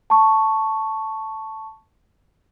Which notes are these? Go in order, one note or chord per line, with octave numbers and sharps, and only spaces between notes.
A5 C#6